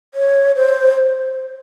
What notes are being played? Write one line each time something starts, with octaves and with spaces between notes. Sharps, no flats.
C#5
C5